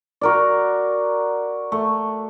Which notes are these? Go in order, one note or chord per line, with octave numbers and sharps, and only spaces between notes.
F#4 A#4 D5
A3